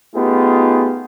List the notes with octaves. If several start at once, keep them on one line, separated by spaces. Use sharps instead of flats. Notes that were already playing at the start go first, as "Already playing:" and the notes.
A3 B3 D#4 F4 G4 G#4